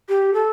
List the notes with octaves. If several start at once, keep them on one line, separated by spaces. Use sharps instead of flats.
G4
A4